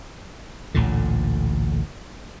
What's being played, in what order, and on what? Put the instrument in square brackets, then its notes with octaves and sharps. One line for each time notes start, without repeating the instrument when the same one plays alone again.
[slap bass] A1 D2 A#2 D3